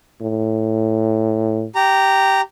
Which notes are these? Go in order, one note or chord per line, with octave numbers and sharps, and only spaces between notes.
A2
G4 A#5